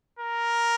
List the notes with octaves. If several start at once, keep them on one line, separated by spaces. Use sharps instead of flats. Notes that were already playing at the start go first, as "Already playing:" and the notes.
A#4